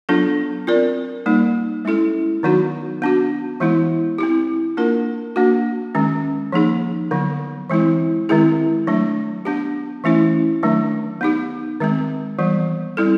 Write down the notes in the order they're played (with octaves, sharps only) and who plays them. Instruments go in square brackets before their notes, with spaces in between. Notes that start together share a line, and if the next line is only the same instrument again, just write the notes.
[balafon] F#3 B3 D4 F4 A4
C4 F4 A#4 D5
G3 A#3 D#4
G#3 C#4 E4 A4
D#3 F#3 B3 D#4 F#4
B3 D4 F#4
E3 G#3 B3 E4
C4 E4 G4
A#3 D4 F4 A#4
A#3 D4 F#4
D#3 G#3 C#4
F3 A#3 D#4 G#4
D3 F#3 B3
E3 G#3 C4 E4
D#3 G#3 C4 E4 G#4
F#3 A3 D4
B3 D4 G4
E3 A3 C#4 E4
D#3 F#3 A3 D4
B3 D#4 G4
D#3 G#3 C4
E3 G3 B3
G3 C4 E4 A4